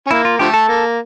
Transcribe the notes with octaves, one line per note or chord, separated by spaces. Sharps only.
C#4
A#3 E4
F4
D3 F3 A3 G4
A4
A#3